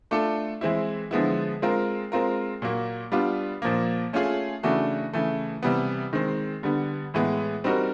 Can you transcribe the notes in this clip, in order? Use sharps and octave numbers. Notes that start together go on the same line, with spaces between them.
A3 D4 F4 A4
E3 G#3 C4 E4
D3 F3 G#3 B3 E4
G#3 C4 F4 A#4
G#3 C4 F4 A#4
A#2 F#3 A#3
G3 B3 D4 F4
A#2 F3 A#3
A3 C#4 F4 G#4
C#3 E3 A3 D4 F#4
C#3 E3 A3
C3 E3 G3 B3
D#3 G#3 C4
D3 G3 B3
A2 E3 G#3 B3
G3 C4 D#4 F#4 A#4